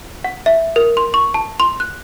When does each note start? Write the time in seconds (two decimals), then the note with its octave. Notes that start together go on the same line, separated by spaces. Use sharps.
0.24 F#5
0.46 E5
0.76 A#4
0.97 C6
1.14 C#6
1.34 A5
1.60 C6
1.80 F#6